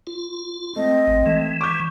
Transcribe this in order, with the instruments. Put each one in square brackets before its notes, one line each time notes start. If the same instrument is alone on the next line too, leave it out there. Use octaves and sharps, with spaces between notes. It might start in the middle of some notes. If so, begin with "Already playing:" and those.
[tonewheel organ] F4
[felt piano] A3 [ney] C4 [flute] D#5
[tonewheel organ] G#1
[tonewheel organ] E3 [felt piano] A3
[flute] C#6 [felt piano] D6 G6